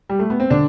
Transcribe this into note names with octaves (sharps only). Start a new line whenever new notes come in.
G3
A3
B3
C4
D3 D4